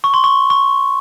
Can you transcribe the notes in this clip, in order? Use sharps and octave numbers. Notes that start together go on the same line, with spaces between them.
C#6
C6
C#6
C#6